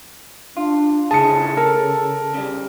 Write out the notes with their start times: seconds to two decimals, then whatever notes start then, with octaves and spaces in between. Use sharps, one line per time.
0.57 D4 F4
1.11 A2 C#3 G#4 A5 C#7
1.57 A4 A#4
2.34 C#3 G3